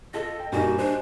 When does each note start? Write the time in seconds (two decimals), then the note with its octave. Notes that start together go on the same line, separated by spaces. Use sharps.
0.14 F4 A4 D#5
0.40 G5
0.52 G2 A#2 D#4 F#4 G4 D#5 G#5
0.78 D4 C5